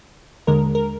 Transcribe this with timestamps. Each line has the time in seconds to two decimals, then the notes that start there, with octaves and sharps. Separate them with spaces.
0.47 D#2 D3 G#3 A#4
0.75 A#4